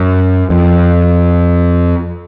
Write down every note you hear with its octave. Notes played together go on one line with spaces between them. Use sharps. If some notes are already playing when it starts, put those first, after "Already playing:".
Already playing: F#2
F2